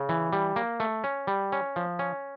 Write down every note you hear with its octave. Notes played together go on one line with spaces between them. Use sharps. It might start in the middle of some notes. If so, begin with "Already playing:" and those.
Already playing: C#3
E3
G3
A#3
A3
C#4
G3
C#4
F3
C#4